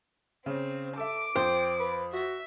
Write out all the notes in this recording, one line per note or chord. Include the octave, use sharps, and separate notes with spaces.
C#3 C4
A4 E5 D6 D7
F2 C5 G5
B4
F#4 E5